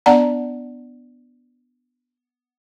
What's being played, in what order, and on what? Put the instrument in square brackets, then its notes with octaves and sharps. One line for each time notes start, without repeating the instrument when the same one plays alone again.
[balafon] B3 D4 D5 F#5 A5 A#5